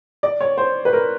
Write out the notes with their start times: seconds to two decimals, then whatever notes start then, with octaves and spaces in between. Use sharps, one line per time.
0.23 D5
0.41 C#5
0.58 C5
0.85 B4
0.93 A#4